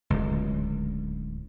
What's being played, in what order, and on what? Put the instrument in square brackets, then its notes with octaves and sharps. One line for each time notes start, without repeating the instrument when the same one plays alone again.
[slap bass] D1 C#2